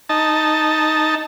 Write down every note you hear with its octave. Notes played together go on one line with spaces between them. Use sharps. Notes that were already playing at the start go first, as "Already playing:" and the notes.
D#4 A5